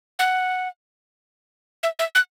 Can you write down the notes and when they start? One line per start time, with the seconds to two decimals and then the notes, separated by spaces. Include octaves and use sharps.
0.19 F#5
1.83 E5
1.99 E5
2.15 F#6